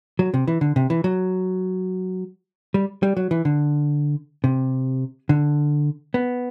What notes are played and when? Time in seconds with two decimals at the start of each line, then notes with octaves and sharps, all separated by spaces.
0.19 F#3
0.34 C3
0.48 E3
0.61 D3
0.76 C3
0.90 E3
1.04 F#3
2.74 G3
3.03 G3
3.17 F#3
3.31 E3
3.45 D3
4.44 C3
5.29 D3
6.14 B3